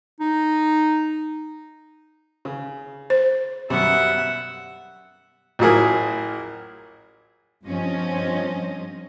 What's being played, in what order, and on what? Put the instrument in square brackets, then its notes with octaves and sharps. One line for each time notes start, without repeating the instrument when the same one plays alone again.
[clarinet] D#4
[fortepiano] C#3
[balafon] C5
[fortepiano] F#2 B2 G3 [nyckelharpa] E5 F#5
[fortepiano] A1 F3 F#3 E4 G#4 A#4
[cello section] G2 F3 C4 C#4 D#5